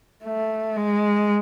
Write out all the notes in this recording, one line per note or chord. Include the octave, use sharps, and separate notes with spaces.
A3
G#3